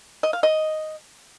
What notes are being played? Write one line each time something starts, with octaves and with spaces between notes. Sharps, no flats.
D#5
F5
D#5